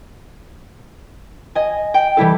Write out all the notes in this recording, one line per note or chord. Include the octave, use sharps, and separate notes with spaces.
D#5 G#5
G5
E3 G3 E4 A4